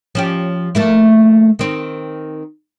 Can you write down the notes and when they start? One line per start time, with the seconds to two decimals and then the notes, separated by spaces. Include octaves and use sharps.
0.15 F3 C#4 G4
0.75 A3 A#3 E4
1.59 D#3 C4